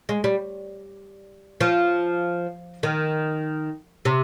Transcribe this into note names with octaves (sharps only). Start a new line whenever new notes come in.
G#3
G3
F3
D#3
C3